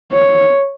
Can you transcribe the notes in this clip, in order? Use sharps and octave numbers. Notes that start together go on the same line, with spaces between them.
C#5